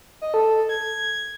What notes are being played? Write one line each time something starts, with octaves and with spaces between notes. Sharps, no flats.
D#5
A4
G#6